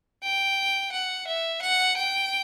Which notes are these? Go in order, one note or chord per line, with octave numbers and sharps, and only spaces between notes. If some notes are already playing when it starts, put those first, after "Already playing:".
G5
F#5
E5
F#5
G5